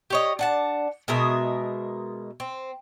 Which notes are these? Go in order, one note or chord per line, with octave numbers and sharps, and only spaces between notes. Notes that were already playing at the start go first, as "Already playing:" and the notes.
G4 C#5 D#5
D4 F#5 A5
B2 G#3 A#4 E5
C4